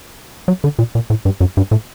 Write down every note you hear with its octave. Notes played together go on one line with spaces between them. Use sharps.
F#3
D3
A#2
A#2
A2
G2
F#2
G2
A2